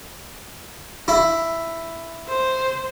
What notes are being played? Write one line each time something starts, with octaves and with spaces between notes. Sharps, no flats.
E4
C5